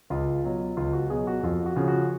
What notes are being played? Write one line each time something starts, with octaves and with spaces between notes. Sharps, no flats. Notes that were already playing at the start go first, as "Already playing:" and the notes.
C#2 F4
B2 F#3
C#2 F4
F#4
B2 F#3 G#4
F#4
F2 F4
F#4
C#3 F3
F#4